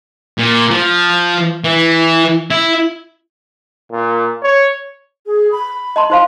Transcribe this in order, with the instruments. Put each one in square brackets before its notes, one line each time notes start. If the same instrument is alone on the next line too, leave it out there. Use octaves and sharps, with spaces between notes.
[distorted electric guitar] A#2
F3
E3
E4
[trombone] A#2
C#5
[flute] G#4
B5
[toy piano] D#5 A5 C6
[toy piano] D#4 C5 F5 [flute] C6